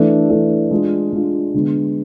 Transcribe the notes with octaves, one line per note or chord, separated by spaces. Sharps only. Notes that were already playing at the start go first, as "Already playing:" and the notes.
Already playing: E3 A3 D4 A4
E3 A3 D4 A4
G#3 D4 F4
G#3 D4 F4
D3 G#3 B3